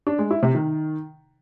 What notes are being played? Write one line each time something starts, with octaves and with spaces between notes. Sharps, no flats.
D4
G#3
E4
C3
D#3